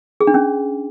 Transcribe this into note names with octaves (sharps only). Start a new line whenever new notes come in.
G#4
D4
C#4